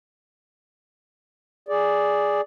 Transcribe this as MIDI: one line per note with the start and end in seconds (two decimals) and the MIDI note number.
1.68 2.41 68
1.68 2.41 74